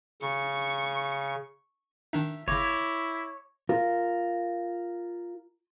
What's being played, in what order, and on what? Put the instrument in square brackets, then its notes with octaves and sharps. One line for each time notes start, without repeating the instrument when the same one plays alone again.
[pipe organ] C#3 [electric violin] C#6 C#7
[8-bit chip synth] D#3 D4 D#4 [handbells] E5
[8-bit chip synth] G1 C#3 [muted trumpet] E4 [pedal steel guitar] C#5 [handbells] D6 G#6 A#6
[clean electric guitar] F4 A#4